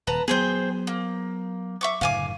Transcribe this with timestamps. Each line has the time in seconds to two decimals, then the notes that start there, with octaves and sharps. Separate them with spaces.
0.07 D#1 B4 A5 A#5
0.28 F#3 B3 G#4 C5 G5
0.87 A#3
1.81 E5 C#6 D6
2.01 F#1 A2 D3 F5 G#5 D6